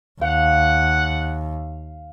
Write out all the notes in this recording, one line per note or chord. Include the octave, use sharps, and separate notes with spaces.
D#2 F5 F#5